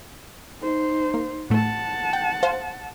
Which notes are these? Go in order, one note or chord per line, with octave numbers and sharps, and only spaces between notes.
D#4 C5
A#3
A2 A3 F#5 A5
G5
C5 F5